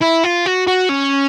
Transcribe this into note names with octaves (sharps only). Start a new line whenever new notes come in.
E4
F4
F#4
F#4
C#4